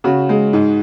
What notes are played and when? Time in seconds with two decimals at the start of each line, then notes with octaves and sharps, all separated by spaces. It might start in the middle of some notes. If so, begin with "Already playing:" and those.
0.04 C#3 F#4
0.29 G#3
0.53 G#2